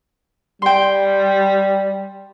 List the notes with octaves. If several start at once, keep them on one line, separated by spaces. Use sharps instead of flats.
G3 G5 C6